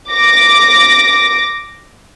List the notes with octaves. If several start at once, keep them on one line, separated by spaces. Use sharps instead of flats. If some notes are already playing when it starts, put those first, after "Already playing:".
D6 A#6